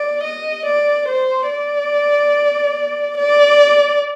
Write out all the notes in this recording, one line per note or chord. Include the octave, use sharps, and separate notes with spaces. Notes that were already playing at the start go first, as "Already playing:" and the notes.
Already playing: D5
D#5
D5
C5
D5
D5